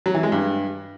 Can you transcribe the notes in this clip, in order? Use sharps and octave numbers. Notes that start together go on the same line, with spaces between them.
F#3
E3
G#3
G2